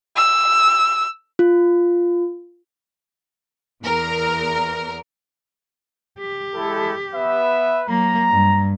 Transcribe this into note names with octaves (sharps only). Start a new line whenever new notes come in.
E6
F4
E2 A#4
G4
G#3 E4 A4
B3 B4 E5
F#3 A#3 A#5
G2